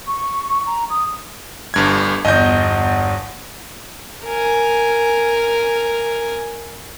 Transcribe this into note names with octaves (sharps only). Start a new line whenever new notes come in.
C#6
A#5
D#6
G1 G2 G#6
G1 E2 D#5 G6
A#4 G#5